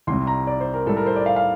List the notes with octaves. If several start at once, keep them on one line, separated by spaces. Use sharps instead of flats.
C2 C3 G3 C6
A#5
D5
C5
A#4
A2 G3 A4
A#4
C5
D5
F5
F5